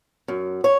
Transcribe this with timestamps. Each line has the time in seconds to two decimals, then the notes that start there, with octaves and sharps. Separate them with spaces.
0.28 F#2
0.64 C#5